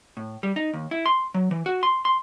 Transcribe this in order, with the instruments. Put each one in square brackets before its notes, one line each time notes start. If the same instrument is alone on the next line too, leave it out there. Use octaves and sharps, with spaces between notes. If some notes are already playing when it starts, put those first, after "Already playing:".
[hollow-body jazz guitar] A2
G3
D#4
D#2
E4
C6
F#3
E3
F#4
C6
C6